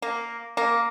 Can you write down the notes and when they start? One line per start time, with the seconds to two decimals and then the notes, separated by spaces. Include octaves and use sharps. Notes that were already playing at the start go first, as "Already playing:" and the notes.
0.02 A#3
0.57 A#3